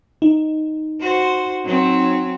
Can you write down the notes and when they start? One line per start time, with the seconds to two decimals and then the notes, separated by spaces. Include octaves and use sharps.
0.22 D#4
1.00 F#4 C5
1.64 F#3 C4